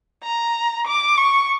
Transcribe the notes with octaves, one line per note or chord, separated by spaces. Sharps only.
A#5
D6
C#6